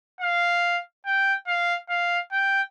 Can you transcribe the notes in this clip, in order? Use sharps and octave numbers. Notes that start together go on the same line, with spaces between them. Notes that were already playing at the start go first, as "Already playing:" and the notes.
F5
G5
F5
F5
G5